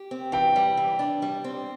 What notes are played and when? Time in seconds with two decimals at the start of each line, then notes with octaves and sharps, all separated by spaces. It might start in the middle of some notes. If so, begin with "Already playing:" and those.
Already playing: G4
0.11 C4
0.32 E3 G5
0.56 G3
0.77 E3
0.99 D4
1.22 G3
1.44 C4